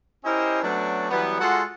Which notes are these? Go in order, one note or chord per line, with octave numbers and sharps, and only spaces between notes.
C#4 E4 G4 A#4 C5 D#5
F#3 A3 B3 C#4 D4
E3 F#3 G3 B3
G#3 F4 F#4 G#4 A4 F#5